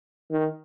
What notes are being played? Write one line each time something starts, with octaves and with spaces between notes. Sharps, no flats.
D#3